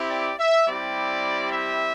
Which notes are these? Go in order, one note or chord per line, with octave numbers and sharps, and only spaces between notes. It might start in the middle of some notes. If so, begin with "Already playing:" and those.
Already playing: C4 E4 G4
D5
E5
G3 C4 E4 G4 D5
E5